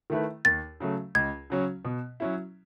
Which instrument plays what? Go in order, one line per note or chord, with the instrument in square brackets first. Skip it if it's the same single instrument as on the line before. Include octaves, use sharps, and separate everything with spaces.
[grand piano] D#3 A3 E4 B4
[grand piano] D#2 [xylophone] A6
[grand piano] C#3 F#3 A3
[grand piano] C#2 [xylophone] G#6
[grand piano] C#3 F#3 C#4
B2
F#3 C#4 E4